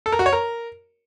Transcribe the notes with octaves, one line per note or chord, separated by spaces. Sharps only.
A4
A#4
F#4
C#5
A#4